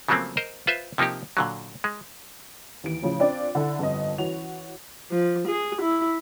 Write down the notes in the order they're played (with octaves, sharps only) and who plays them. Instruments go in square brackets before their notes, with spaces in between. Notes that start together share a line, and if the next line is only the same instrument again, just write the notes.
[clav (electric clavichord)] C#3 F3 F#3 A3 A#3 C4
A#4 C5 D#5
F4 B4 C5 E5
C3 F3 A#3 D#4 G4
A#2 D3 F#3
G#3
[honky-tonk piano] D#2 E3 D7
A2 C#3 F3
C4 D4 F4 D5
D3 E4 A4
G1 F2 D#5
E3 C#4 F#4 F7
[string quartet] F3
G#4
E4